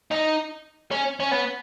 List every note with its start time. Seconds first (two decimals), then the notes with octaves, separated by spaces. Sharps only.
0.12 D#4
0.91 C#4
1.20 C#4
1.31 B3